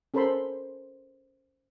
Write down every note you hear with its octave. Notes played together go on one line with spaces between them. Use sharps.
C#4 A4 A#4 C5 B5 C6